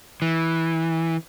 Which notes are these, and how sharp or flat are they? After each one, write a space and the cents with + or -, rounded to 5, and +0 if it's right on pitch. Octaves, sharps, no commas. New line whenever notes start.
E3 -10